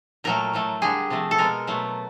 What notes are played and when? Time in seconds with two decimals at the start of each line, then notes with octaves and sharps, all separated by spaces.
0.24 A#2 F#3 A3 A#4
0.53 A2 F#3 A3
0.82 D3 G3 G#4
1.10 C3 F3 A3
1.31 A4
1.38 B2 G#3 A#4
1.67 B2 F#3 A3